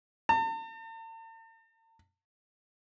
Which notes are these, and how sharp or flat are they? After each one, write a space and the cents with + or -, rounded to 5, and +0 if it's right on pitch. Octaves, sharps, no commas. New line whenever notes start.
A5 +45